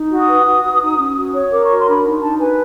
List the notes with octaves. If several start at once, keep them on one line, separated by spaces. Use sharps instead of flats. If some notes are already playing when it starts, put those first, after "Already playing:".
Already playing: D#4
F#4
D#6
B4
F#4
F#4
D#4
C#4
F#4
C#5
A#4 D6
C#6
F#4
C6
D4 B5
D#4
D#4 A5
B4 G#5